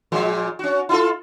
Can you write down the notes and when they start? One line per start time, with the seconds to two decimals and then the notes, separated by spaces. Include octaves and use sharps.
0.12 A#2 F3 G#3
0.59 C#4 F#4
0.89 E4 F4 A4